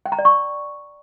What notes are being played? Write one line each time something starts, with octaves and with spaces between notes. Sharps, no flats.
G5
A#5
D5
C#6